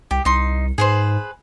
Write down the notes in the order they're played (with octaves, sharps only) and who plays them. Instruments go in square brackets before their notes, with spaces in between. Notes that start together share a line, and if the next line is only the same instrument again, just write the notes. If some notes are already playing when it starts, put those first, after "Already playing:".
[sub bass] C2 [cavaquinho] G4
[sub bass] C2 [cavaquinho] D#4 C6
[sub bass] G#2 [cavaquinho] G#4 B4 C5